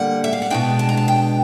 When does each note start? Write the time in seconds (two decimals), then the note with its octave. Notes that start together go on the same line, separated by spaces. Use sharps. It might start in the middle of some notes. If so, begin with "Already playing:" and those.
Already playing: D3 G3 A#3 F#5
0.24 E5
0.33 F5
0.42 F#5
0.50 B2 G#3 B3 D4 G5
0.79 A5
0.89 A#5
0.97 A5
1.08 G5